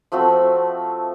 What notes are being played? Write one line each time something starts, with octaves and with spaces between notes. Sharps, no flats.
F3 A3 C4 F#4